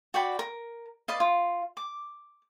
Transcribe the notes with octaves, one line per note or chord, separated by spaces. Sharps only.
F#4 D5 G5 B5
A#4
B4 D5 D#5 F5
F4
D6